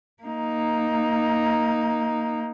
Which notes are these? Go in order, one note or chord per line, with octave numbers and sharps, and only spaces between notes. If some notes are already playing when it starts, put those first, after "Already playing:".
A#3 D#4